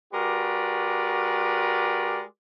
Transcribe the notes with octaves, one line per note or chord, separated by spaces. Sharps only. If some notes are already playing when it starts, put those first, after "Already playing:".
G#3 F#4 G4 A#4 B4 D5